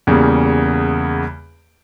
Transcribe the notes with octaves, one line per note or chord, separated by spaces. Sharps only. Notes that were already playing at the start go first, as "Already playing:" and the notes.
E2 C#3 G3 A#3